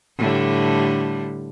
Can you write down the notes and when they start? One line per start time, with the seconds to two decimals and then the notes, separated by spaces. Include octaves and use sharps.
0.18 A2 D3 G3